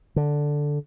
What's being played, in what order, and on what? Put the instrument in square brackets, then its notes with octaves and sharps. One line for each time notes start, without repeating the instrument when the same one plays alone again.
[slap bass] D3